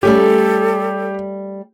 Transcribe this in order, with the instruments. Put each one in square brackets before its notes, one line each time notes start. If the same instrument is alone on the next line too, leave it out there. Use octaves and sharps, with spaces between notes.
[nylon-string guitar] G3 A3 C#4 [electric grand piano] G4 [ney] A4